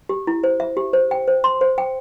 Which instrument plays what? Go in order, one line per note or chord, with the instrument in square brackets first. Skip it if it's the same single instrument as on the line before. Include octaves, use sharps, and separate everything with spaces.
[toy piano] G4
E4
C5
E5
G4
C5
G5
C5
C6
C5
G5